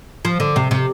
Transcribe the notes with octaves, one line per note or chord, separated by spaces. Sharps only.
F3
D3
C3
C3